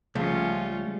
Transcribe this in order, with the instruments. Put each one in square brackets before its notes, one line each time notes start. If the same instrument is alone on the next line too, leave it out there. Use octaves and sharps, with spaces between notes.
[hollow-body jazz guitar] C#2 [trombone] F3 [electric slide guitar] G3 A3 [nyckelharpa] C#4 F4